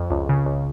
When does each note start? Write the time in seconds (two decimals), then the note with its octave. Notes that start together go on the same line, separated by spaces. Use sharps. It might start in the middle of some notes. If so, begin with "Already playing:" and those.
Already playing: F2
0.10 C#2
0.29 C#3
0.46 C#2